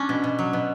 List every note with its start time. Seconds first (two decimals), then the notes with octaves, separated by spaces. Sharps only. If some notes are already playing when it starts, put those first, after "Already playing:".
Already playing: C#4 D4
0.09 B2
0.24 B2
0.39 F#3
0.53 B2